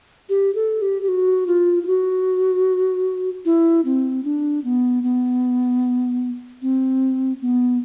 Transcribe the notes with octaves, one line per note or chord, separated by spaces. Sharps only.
G4
A4
G4
G4
F#4
F4
F4
F#4
E4
C4
D4
B3
B3
C4
B3